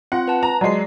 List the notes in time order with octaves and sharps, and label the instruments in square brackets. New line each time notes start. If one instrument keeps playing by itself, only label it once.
[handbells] C4 F4 [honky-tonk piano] F#5
[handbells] B4 A5
[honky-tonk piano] A#5
[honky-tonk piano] F#3 G#3 [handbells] D5 C7